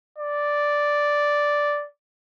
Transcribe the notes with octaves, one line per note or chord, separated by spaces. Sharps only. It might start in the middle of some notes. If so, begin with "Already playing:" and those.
D5